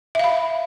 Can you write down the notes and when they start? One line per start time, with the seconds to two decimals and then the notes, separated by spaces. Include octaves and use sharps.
0.15 E5
0.19 F5
0.24 B5